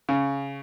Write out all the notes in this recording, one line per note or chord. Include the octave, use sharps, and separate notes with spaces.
C#3